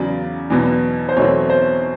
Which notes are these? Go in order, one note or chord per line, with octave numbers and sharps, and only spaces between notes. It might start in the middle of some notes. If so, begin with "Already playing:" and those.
Already playing: E2 C#3 F#3 D5
E2 B2 F#3 B3
C5
E2 B2 F#3 A3 C4 C#5
C5